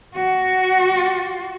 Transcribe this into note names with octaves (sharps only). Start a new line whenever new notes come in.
F#4